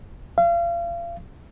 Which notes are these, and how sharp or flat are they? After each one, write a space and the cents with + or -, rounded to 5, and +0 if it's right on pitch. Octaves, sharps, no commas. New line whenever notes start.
F5 -35